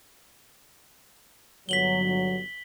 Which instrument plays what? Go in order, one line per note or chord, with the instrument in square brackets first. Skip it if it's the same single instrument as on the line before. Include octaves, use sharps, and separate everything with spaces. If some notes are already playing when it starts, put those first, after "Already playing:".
[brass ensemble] G1 F#3 [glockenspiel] B6 F#7 G7